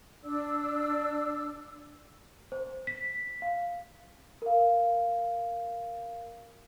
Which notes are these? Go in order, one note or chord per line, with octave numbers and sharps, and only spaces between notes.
D4 D5 E6
C5
B6
F5
A#4 F5